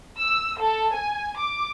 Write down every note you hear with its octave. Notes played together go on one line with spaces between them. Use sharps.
E6
A4
G#5
D6